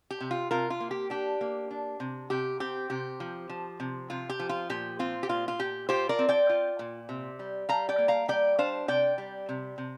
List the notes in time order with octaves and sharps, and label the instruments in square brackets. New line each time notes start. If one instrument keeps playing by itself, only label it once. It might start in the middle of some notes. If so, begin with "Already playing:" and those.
[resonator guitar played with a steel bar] G4
C3
F4
C3 F4 A#4
F4
A#3
G4
D4 G4
A#3
D4
C3
C3 G4
C4 G4
C3 G4
F3
F3
C3
C3 F4
G4
F3
F4
A#2 G4
C4 F4
G4
A#2 F4
F4
A#2 G4
F4 G4 C5
A#4 D5
C4
D5 G5
F4
A#2
C3
G3
G3 F5 A#5
D5 G5
A#3
F5 A#5
G3 D5 G5
D4 C5 F5
C3 D5 G5
G3
C3
C3